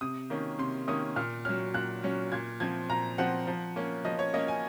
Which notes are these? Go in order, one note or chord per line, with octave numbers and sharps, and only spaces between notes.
C3 D#6
D#3 A#3 C#4
C3 C6
D#3 A#3 C#4 D#6
A#2 F6
F#3 C#4 F6
A#2 F#6
F#3 C#4
A#2 G#6
F3 C4 G#6
A#2 A#5
F3 C4 F#5
F3
A#3 C#4
F3 D#5
C#5
A#3 C#4 D#5
G#5